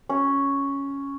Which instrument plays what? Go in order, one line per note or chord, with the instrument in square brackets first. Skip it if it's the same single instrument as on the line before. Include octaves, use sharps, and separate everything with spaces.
[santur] C#4